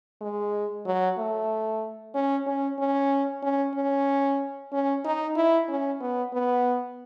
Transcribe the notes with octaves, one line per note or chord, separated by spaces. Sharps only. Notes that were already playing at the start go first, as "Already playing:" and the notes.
G#3
F#3
A3
C#4
C#4
C#4
C#4
C#4
C#4
D#4
E4
C#4
B3
B3